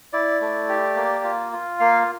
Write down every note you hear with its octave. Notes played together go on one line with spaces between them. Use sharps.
E4 D5
A3
G4
A#3
F4
F4
A#3 F5